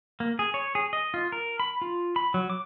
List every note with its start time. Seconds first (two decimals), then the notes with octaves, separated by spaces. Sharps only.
0.20 A#3
0.39 G#4
0.54 C#5
0.75 G#4
0.93 D#5
1.14 F4
1.32 A#4
1.60 B5
1.82 F4
2.16 B5
2.34 F#3
2.50 D6